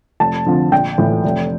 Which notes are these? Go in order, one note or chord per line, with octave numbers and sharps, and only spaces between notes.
F1 A5
F2 D3 F3
A#1 G5
A2 E3
F1